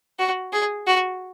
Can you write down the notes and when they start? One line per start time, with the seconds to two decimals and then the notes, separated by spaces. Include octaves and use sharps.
0.19 F#4
0.53 G#4
0.87 F#4